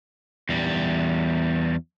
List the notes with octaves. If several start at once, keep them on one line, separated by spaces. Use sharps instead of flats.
E2 G3